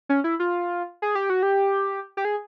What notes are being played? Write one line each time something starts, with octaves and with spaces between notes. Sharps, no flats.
C#4
E4
F4
G#4
G4
F#4
G4
G4
G#4